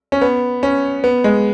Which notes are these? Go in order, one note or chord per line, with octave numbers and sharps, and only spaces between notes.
C#4
B3
C#4
B3
G#3